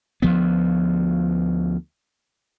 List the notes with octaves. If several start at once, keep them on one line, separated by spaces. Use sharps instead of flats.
D2 F3 B3